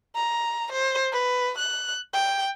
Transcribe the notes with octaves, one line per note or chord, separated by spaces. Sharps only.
A#5
C5
B4
F#6
G5